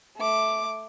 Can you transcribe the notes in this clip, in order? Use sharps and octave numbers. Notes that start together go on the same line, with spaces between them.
A3 D6